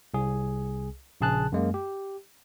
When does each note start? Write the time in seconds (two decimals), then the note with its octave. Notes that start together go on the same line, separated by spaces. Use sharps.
0.14 C2 G#4
1.21 A#1 C#3 G#4 A5 F#6
1.52 F#2 G#3 A#3
1.74 G4